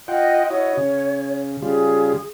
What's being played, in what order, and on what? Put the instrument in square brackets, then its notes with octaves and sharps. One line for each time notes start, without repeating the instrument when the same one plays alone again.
[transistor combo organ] F4 F#5 G5 [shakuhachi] D#5
[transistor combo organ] E4 F#4 D#5 [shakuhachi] C#5
[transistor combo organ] C#3
[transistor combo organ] C#3 G3 F4 [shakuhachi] G#4